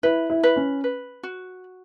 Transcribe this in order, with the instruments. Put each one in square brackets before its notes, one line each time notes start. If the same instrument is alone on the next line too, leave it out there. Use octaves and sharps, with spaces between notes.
[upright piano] E4 [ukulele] B4
[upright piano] E4
[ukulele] B4
[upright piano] C#4
[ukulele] B4
F#4